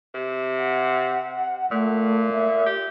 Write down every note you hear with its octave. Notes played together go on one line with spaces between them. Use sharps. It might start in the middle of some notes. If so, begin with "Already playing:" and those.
C3
F#5
A#2 A3
E5
G4